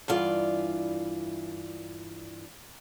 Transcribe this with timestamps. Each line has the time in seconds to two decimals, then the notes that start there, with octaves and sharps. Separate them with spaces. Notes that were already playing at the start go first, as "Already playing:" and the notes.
0.08 G2 E3 F4 D5